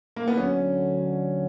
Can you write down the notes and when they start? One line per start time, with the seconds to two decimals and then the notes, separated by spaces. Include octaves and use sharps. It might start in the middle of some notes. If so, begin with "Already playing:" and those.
0.16 A#3
0.28 B3
0.37 D2 D3 F#3 C#4